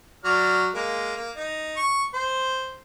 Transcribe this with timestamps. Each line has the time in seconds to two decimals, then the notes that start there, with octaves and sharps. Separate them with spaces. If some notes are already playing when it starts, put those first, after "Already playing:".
0.24 F#3 D5 F6
0.74 G#3 A#3
1.16 A#3
1.36 D#4
1.77 C#6
2.14 C5